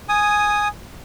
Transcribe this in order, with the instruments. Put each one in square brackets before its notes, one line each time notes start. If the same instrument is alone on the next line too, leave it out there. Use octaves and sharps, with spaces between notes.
[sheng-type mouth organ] G#5 D#6